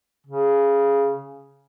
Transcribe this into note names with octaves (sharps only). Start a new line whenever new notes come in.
C#3